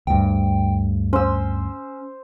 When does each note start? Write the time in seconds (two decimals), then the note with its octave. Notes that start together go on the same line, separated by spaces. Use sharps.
0.07 D2 G2 G5
1.13 C#4 C5 E6